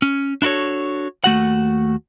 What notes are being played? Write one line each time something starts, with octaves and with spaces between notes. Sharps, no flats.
C#4
D4 E4 F#4 A4 C#5
D#2 A3 F#4 F#5